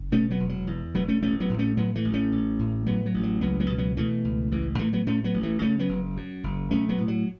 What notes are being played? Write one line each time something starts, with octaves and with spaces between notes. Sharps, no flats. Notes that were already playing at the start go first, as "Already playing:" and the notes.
Already playing: F#1
B2 A3 C#4
F#3 B3
E1
F#3
E2
E1 F#3 B3
A3 C#4
A1 A3 C#4
F#3 B3
A2
A3 C#4
A2 F#3 B3
E3 A3
A1
A3 C#4
A1
A2
A2 F#3 B3
F#3
A1
F#3
C#2 F#3 B3
F#3 B3
B2
F#3 B3
B2 E3 A3
C#2
A1 E3
A2 E3 A3
F#3 B3
A2 A3 C#4
F#3 B3
A1
E3 A3
C#3 A3 C#4
F#3 B3
F#1
F#2
F#1
B1 A3 C#4
F#3 B3
A2
F#3